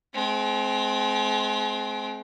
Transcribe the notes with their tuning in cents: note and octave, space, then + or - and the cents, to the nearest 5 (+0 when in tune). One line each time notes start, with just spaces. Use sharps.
G#3 +45 C4 +0